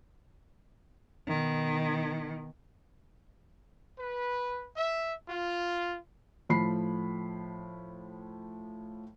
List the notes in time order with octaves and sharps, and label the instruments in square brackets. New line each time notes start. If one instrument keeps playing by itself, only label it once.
[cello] B2 D#3
[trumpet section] B4
E5
F4
[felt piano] A2 F3 B5 C7